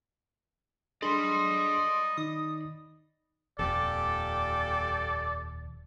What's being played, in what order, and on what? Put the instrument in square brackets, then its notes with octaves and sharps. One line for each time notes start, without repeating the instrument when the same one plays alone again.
[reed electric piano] D4 G#4 A4 [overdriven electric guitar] D5 B5 [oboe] D#5 [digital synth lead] C6
[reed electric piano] D#3 D#4 [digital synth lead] D#6
[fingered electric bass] D#1 F2 [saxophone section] A#2 G4 A4 [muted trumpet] D5